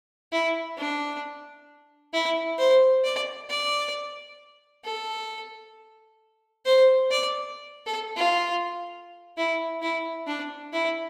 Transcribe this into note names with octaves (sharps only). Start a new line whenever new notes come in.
E4
D4
E4
C5
D5
D5
A4
C5
D5
A4
F4
E4
E4
D4
E4